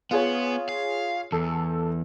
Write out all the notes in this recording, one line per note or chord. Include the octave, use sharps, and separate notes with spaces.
B3 F4 G#4 C#5
F5
E2 A4